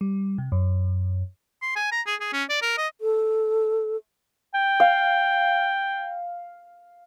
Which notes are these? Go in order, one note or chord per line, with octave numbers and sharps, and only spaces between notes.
G3
C3
F#2
C6
G#5
A#5
G#4
G#4
C#4
D5
A#4
D#5
A4
G5
F5